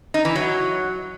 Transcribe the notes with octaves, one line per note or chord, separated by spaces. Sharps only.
D#4
E3
F#3